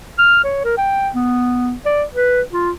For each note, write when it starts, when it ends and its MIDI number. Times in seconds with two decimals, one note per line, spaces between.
0.18 0.41 89
0.44 0.62 73
0.64 0.75 70
0.78 1.09 79
1.15 1.73 59
1.86 2.04 74
2.15 2.41 71
2.53 2.70 65